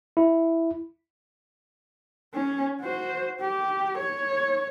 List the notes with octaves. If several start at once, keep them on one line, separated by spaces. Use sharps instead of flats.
E4
C#4
F#4 C5
G4
C#5